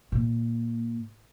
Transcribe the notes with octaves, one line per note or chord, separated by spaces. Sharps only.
A#2